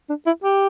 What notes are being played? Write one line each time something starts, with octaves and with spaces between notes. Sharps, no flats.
D4
E4
G4